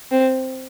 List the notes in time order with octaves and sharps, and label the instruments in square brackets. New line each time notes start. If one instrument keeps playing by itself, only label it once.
[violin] C4